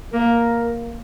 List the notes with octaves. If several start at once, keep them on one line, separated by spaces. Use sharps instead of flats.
A#3 A#4